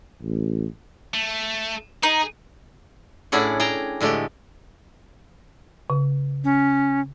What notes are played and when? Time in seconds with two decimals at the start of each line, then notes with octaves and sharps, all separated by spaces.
0.21 A1
1.14 A3
2.03 D#4 G#4
3.32 A2 C#4 D4 E4 G#4 F#5
3.60 G#4 G5 A5 A#5
4.01 A2 D3 G#3 A3 G4
5.90 C#3
6.44 C#4